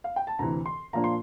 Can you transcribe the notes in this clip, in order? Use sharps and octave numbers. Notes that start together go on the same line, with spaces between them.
F5
G5
A5
D2 C3 E3 A#5
C6
A#2 F3 A#3 D4 A#5
C6